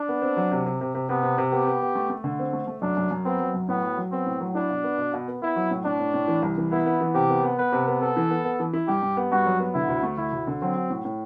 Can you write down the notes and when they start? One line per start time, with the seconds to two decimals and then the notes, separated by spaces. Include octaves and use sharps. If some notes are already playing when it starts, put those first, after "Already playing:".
Already playing: D4
0.09 B3
0.22 C4
0.37 F#3
0.51 C3
0.66 C3
0.81 C3
0.95 C3
1.09 C3 B3
1.23 C3
1.38 C3
1.52 B3 G4
1.67 B3
1.81 B3
1.95 A3
2.10 A3
2.24 D3
2.39 C4
2.53 A3
2.67 A3
2.82 F#2 D4
2.97 F#2
3.11 F#2
3.25 B3 C4
3.40 F#3
3.54 F#2
3.68 A2 B3
3.83 F#4
3.98 F#3
4.12 B3 C4
4.26 A2
4.41 F#3
4.55 D4 E4
4.70 B2
4.84 B3
4.98 B2
5.13 B2
5.28 B3
5.42 B3 E4
5.56 F#3
5.71 A2
5.85 A2 D4
6.00 A2
6.14 A2
6.28 E3
6.42 C2
6.58 E3
6.72 B3 E4
6.86 B3
7.01 E3
7.14 C3 G4
7.29 B3
7.43 B3
7.58 B3 B4
7.72 C3
7.88 B3
8.01 B3 A4
8.17 E3
8.30 B3
8.44 B3
8.60 E3
8.73 E4
8.88 G2 G4
9.02 G2
9.17 B3
9.32 G2 F#4
9.46 F#3
9.60 B3
9.74 D3 E4
9.89 D2
10.03 A3
10.18 D2 E4
10.33 D2
10.47 D3
10.62 F#3 C4
10.76 F#4
10.90 A2
11.05 A2